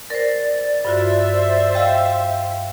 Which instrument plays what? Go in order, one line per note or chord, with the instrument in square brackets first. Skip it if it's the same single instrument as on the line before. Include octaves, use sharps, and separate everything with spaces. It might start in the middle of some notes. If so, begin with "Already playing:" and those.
[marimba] A#4 C5 [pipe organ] D5
[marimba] G2 F4 F#4 [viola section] C5 E5
[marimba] D#5 [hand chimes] F5 G5